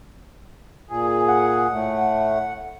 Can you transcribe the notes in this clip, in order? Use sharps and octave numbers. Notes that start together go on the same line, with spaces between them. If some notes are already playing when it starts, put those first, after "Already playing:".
A#2 G#4
F#5
A2 A3